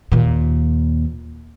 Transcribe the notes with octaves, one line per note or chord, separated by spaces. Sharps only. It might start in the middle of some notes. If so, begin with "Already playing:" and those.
D#2 A#2